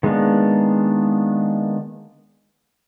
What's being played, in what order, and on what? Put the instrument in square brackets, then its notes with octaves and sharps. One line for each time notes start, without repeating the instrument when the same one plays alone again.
[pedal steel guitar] D#3 G#3 A#3 B3 D4